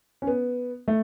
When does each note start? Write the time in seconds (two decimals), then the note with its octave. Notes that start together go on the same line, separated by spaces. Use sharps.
0.22 C#4
0.27 B3
0.88 A3